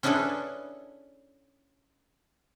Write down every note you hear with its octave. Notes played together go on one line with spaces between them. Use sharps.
C#4 D4 E4 G#4 A4 B4